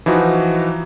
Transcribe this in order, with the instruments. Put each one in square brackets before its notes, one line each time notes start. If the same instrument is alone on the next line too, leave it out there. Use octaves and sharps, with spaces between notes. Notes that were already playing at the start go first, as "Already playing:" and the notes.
[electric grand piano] E3 F3 D#4 F#4